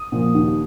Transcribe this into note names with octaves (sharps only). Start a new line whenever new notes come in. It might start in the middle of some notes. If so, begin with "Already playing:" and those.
Already playing: D#6
A#2 F3
D#2